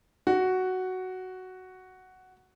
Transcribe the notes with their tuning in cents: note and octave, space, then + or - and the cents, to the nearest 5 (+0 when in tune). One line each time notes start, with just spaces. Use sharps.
F#4 +5